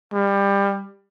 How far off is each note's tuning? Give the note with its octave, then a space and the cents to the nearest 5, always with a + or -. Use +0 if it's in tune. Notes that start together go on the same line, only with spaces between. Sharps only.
G3 +25